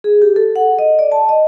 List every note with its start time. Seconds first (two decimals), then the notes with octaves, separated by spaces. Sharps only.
0.04 G#4
0.22 G4
0.36 A4
0.56 F#5
0.79 D#5
0.99 D5
1.12 A5
1.29 D#5